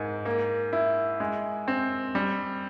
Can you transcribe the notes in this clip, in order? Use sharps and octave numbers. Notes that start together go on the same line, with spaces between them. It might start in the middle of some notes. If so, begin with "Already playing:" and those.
Already playing: G#2 A#3
A#3
E4
G#3
C4
G3